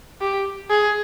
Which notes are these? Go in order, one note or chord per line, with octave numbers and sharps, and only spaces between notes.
G4
G#4